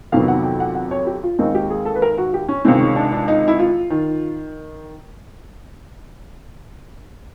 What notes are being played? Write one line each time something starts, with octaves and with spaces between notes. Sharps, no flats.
F2 C3 D#3 F#3 B3 F5
F#5
G5
F#5
F#5
C#5
G4
F4
D#2 D#3 G#3 C4 D#4
G4
G#4
A4
B4
A#4
F#4
G4
C#4
C#2 C3 D#3 G#3 C4
C#4
D4
D4
D#4
E4
F4
D#3